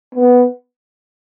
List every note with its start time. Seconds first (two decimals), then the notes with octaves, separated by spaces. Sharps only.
0.15 B3